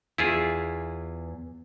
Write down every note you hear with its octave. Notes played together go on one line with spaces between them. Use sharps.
E2 E4 F4 G#4